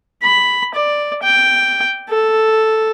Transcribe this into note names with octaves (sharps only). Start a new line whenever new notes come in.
B5
D5
G5
A4